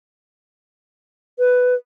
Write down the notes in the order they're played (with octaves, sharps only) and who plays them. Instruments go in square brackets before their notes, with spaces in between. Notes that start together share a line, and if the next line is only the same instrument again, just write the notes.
[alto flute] B4